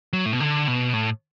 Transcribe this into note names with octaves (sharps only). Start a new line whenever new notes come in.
F#3
A2
B2
D3
B2
A2